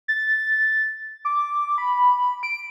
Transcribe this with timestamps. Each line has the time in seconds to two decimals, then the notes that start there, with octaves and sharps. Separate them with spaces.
0.08 A6
1.25 D6
1.78 B5
2.43 D7